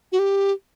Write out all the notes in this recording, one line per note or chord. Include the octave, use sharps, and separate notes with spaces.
F#4
G4